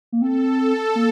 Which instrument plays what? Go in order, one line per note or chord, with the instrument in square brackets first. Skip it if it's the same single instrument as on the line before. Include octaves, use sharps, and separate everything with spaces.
[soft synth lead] A#3
[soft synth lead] C4 [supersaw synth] A4
[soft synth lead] A#3